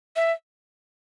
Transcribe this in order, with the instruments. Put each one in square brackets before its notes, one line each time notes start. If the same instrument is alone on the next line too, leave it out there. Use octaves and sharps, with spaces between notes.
[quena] E5